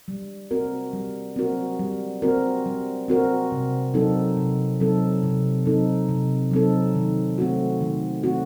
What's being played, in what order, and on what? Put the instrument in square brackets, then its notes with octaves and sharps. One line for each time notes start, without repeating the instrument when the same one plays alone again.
[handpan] G3
C4 F#4 A#4
G3
C4 F#4 A#4
G3
C4 F#4 A#4
G3
C4 F#4 A#4
C3
F#3 C4 D#4 A4
C3
F#3 C4 D#4 A4
C3
F#3 C4 D#4 A4
C3
F#3 C4 D#4 A4
D#3
A3 C4 F#4
D#3
A3 C4 F#4